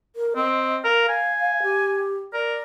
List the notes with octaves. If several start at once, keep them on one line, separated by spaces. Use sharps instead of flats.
A#4
C4 D#5
A#4 F5
G#5
G4
A#4 D5